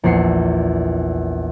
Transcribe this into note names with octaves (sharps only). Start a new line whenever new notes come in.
A#1 E2 C7 C#7